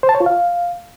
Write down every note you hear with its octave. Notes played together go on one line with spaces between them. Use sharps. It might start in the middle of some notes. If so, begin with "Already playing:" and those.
C5
A5
C#5
F4
F5